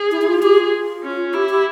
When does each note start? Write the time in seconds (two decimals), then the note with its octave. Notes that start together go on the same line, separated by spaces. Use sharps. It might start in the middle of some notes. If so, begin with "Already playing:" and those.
Already playing: G#4
0.11 E4
0.22 E4
0.28 F4
0.42 G4 G#4
0.58 F4
1.03 C#4
1.34 E4 G4
1.49 G4